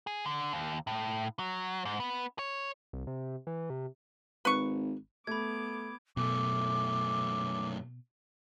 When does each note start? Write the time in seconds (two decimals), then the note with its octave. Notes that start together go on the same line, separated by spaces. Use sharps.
0.07 G#4
0.26 D3
0.52 D#2
0.87 A2
1.39 F#3
1.85 G#2
2.00 B3
2.39 C#5
2.93 C2
3.07 C3
3.47 E3
3.70 C3
4.45 G#1 B4 C#6
5.27 A3 B3 B5 D6 G#6
6.17 F#2 B2 A3 D6